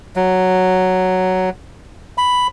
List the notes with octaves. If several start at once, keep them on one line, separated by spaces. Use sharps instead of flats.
F#3
B5